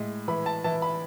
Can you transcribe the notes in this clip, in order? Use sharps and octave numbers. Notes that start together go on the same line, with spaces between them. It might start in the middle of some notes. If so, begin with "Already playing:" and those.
Already playing: A2 G#3
E3 B5
A5
E3 A5
B5